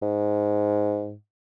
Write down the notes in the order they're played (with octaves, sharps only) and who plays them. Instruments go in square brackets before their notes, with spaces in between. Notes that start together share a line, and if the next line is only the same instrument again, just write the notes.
[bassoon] G#2